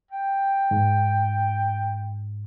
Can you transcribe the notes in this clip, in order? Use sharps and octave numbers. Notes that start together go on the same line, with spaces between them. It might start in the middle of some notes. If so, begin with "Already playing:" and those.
G5
G#2